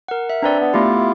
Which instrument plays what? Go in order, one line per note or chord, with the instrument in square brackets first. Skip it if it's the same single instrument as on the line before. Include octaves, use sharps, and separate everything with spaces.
[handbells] A#4 F#5
E5
[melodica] C4 A#5 [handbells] D4 B4 D5
[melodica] B3
[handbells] A3 B3 G4 [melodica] E4 F4